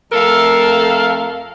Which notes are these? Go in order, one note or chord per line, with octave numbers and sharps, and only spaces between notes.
F2 A3 A4 A#4 F5